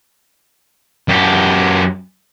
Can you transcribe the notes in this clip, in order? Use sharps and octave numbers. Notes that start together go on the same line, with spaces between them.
F#2 G4